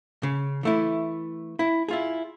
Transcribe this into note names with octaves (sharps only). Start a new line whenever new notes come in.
C#3
E3 A3 E4
E4
E4 F4 G#4